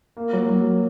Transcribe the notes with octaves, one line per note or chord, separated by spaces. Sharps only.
A#3
F#3
F#3